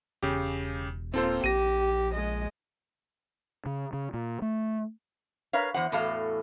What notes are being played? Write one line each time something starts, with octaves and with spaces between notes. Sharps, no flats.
E1 C#3 G4
D#1 A#3 C4 F4 A4 C5
A#1 G4 A#6 D#7
G#3 D#5
C#3
C#3
A#2
A3
A#4 B4 C#5 F5
E2 C5 F#5
E2 A2 E3 F#4 A4 F5